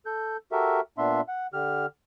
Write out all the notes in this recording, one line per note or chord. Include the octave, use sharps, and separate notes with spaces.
A4 G6
F#4 G4 A4 A#4 E5
A#2 B3 D4 E5 C6
F#5
D3 G4 F6